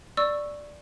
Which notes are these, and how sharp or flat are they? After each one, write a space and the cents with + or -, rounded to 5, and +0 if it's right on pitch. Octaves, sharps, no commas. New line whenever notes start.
D5 +0 C#6 -5 E6 +0